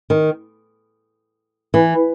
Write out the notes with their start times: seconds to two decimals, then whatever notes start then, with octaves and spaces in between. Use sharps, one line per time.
0.10 D#3
1.74 E3